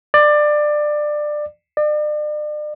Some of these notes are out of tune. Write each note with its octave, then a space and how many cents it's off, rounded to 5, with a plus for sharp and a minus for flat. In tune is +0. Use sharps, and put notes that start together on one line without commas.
D5 +20
D5 +40